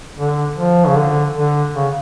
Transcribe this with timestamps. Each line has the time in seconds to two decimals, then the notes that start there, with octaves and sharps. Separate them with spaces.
0.18 D3
0.57 F3
0.87 C#3
0.96 D3
1.35 D3
1.75 C#3